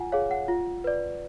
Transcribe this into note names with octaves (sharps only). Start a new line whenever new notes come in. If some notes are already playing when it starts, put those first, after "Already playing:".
Already playing: F4 F#5 G#5
G#4 C#5 F5
F#5
F4
B4 D5